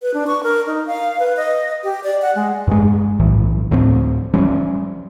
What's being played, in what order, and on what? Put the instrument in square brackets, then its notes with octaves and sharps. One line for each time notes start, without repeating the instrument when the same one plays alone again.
[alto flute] B4
D4
C#6
A#4
D#4
F5
B4
D#5
G4
D5
F#5
G#3
[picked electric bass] G2 G#3
B1 A2 E3
D2 A2 F3 C4
F3 G3 C#4